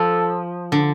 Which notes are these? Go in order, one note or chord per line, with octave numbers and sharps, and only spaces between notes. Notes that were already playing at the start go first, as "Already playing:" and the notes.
Already playing: F3 A4
D3